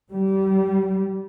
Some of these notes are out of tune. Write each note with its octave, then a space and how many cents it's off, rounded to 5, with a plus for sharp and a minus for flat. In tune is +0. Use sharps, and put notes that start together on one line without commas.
G3 -25